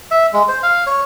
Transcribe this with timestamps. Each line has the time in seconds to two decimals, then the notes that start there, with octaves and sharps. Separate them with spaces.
0.11 E5
0.33 G#3
0.48 C5
0.63 F5
0.87 C#5